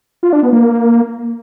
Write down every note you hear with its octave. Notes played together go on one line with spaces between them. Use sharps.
F4
D4
B3
A#3